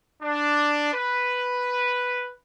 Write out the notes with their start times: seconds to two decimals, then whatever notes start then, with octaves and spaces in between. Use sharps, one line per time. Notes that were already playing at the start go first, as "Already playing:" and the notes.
0.23 D4
0.93 B4